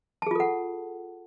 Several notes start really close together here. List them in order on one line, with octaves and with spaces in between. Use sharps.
A5 G#4 F4 A4 F#5